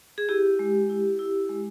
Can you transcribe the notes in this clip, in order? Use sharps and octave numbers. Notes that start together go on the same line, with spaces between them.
G#4
E4 G4
G#3
E4
E4
G#3